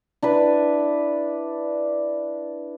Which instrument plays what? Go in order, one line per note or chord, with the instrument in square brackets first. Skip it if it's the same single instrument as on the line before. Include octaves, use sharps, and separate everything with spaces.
[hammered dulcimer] D4 E4 B4